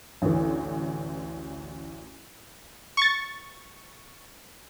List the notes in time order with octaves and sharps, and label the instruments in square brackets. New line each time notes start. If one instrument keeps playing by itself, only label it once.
[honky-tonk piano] A1 D2 E3
[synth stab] C#6 A6